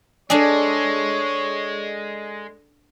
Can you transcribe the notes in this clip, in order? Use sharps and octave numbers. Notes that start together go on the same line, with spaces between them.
G#3 D4 G#4 A4 C#5 D5